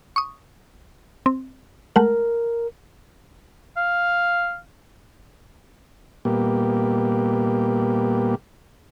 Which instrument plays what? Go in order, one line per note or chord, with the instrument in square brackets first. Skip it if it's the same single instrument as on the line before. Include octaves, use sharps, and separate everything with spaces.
[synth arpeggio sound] C#6 D#6
C4
[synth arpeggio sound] G#3 A3 F#5 [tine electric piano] A#4
[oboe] F5
[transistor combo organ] A#2 G3 A#3 B3 G4